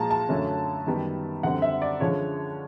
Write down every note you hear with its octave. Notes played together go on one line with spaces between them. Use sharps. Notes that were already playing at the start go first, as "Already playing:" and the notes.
Already playing: A#2 F3 G#3 A5 A#5
A5
F#2 D3 F#3 A3 C#4
F#2 D#3 G3 B3
F#2 D3 G3 C4 F#5
E5
D5
D3 F3 G#3 C#4 C#5